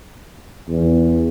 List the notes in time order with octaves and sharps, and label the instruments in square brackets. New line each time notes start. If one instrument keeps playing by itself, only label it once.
[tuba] E2